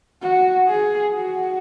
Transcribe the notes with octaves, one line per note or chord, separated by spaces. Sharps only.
F#4
G#4
F#4